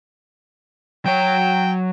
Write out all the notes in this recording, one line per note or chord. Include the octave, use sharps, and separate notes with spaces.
F#3 C#5 G5